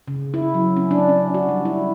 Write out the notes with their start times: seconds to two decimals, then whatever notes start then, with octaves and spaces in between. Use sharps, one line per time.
0.08 C#3
0.34 E4
0.54 F#3
0.77 C#4
0.91 D4
1.09 C#4
1.34 F#4
1.49 G3
1.65 E4